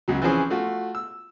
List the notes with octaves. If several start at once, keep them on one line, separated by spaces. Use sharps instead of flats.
C#2 F#3
E3 F3 C4 C#4 G#4
A3 F4 F#4
E6